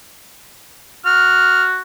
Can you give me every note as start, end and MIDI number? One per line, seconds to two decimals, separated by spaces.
1.06 1.81 66
1.06 1.64 89